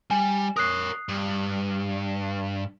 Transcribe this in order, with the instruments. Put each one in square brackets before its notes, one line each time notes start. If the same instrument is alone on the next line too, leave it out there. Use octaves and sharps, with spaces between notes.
[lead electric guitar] G3 [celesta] G#5
[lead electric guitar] A#4 C#5 [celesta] D#6 F#6 C7
[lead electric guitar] G2